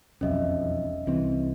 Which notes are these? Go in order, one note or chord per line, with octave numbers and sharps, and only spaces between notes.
E1 B1 F2 C#4 D#5 E5
C2 E3 C4